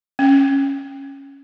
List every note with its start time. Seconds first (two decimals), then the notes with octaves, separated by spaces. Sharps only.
0.19 C#4